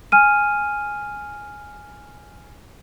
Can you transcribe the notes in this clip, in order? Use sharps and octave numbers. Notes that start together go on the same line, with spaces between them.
G#5 F6 D#7